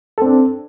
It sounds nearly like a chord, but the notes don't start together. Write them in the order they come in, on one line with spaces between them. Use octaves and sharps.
A4 C4 D4